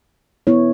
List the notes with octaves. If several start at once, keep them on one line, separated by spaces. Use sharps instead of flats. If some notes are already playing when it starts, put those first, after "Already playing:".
B3 E4 C#5